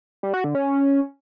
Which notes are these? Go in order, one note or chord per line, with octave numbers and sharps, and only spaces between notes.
G3
F#4
D3
C#4